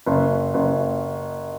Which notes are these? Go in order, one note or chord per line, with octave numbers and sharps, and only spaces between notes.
F#1
F#1